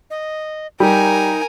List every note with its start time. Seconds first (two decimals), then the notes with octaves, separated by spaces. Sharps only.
0.10 D#5
0.80 G3 D#4 A#4 G#5